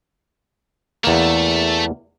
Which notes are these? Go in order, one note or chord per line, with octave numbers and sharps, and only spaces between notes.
E2 A3 A#3